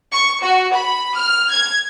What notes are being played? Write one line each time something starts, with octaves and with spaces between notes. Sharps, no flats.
C#6
F#4
B5
F6
G#6